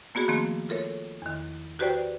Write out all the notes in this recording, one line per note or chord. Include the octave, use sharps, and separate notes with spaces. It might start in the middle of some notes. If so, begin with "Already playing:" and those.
A#3 B3 F#4 G#4
D#3 F3 A3 A#3 C4
F4 A4 A#4 C#5
E2 D#3
F#4 G4 B4 C5 D5 G5